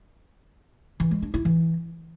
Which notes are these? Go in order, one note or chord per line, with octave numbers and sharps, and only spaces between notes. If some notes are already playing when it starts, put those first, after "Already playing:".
E3
G#3
D4
E4
E3